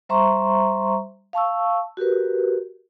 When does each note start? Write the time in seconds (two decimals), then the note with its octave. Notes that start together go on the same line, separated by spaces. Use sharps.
0.09 G3 C5 E5 A#5 C6 C#6
1.33 F5 A5 C#6 E6
1.97 F#4 G4 A#4 B4